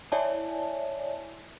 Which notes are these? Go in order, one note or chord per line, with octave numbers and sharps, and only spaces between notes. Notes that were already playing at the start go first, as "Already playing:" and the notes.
E4 C#5 D5 E5 G#5 A5